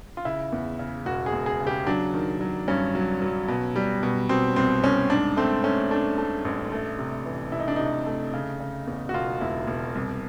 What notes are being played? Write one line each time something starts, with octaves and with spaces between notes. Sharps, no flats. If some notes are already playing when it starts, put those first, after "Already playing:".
F4
C#3 E4
E2
C#3
E1 F#4
G#4
E1
G#4
C#3
G4
F#3 D4
D#3
F#3
G2 C#4
F#3
F#3
B2
G3
B2
B2 C4
C2 C4
C2 C#4
G#2 D4
A3 C4
A3 C#4
A3 D4
A3
A1
A3
C3
E3
C3 E4
D#4
D4
C3 D#4
A3
C#3
C#3
E2
F#4
E1 F4
E1 E4
E1
C2